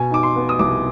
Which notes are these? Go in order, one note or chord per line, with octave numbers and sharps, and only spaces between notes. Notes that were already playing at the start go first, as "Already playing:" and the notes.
Already playing: B2 G#5
D#4 D6
C6
B3
D#6
C2 D6